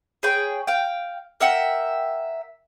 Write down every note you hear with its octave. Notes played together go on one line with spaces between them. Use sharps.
G#4 B4 C#5 G5
F5 G5
A#4 E5 F#5 G5